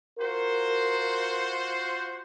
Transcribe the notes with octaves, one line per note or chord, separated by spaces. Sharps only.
F4 F#4 A#4 C5